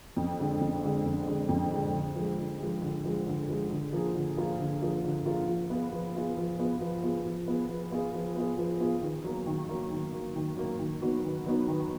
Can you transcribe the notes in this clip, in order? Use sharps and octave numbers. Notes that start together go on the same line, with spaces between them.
F2
D3 G#3 D4
F2
D3 G#3 D4
F2
D3 G#3 D4
F2
D3 G#3 D4
D3
F3 G#3
D3
F3 G#3
D3
F3 G#3
D3
F3 G#3
D3
F3 A#3 F4 G#4
D3
F3 A#3 F4 G#4
D3
F3 A#3 F4 G#4
D3
F3 A#3 F4 G#4
F3
B3 F4 G#4
F3
B3 F4 G#4
F3
B3 F4 G#4
F3
B3 F4 G#4
F3
B3 F4 G#4
F3
B3 F4 G#4
F3
B3 F4 G#4
F3
B3 F4 G#4
D#3
F#3 A#3
D#3
F#3 A#3
D#3
F#3 A#3
D#3
F#3 A#3
D#3
F#3 B3 D#4 F#4
D#3
F#3 B3 D#4 F#4
D#3